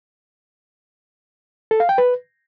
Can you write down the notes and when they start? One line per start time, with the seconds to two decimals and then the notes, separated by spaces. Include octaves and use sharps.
1.71 A4
1.80 F5
1.89 G5
1.98 B4